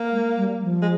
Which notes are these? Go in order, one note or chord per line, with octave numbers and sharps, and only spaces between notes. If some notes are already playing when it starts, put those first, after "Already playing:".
Already playing: A#3
G#3
G3
F3
G#3